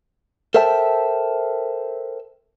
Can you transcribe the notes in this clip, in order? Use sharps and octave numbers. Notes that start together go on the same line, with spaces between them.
A4 A#4 C5 E5 G5 A5